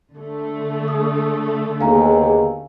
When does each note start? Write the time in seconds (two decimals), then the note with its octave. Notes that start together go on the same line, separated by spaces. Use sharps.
0.14 D3 A3
0.88 D#6
1.81 D#2 B3 G#4 F5 G#5 A#5